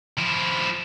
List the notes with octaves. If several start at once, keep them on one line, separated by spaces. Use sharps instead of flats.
F3 E4